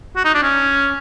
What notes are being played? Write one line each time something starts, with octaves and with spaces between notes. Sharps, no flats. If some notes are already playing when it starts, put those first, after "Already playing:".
F#4
D#4
D4
C#4